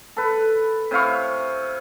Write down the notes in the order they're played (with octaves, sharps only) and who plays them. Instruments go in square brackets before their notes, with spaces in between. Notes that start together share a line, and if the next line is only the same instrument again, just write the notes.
[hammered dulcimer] A4 B4
C3 E4 F5 C#6